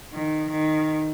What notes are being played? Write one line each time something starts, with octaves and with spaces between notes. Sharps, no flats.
D#3
D#3